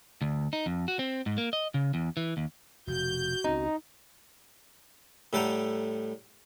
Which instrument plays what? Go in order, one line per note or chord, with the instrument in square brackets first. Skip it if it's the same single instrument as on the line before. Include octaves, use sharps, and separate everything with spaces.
[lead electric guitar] D2
D#4
F2
F#4
C4
G#2
A#3
D#5
C#3
E2
E3
D#2
[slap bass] F1 F2 B2 [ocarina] F#4 [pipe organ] G6
[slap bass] C#2 C4 C#4 [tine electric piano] D#4
[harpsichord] A2 G3 A4 F#5 G5 A#5